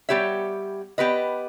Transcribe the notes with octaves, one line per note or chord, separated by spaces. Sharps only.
G3 B3 G4 C#5 E5
B3 G4 B4 D#5